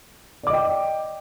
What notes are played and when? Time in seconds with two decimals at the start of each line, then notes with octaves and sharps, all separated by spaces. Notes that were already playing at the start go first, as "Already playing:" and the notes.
0.43 D5
0.47 D6
0.50 D#5
0.53 G5